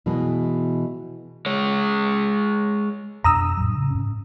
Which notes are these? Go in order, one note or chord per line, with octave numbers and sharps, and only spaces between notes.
B2 E3 G#3
G#3 C#5
F2 B2 D4 A#5 D#6 E6
A2 F#3
C#3
G#2 C#4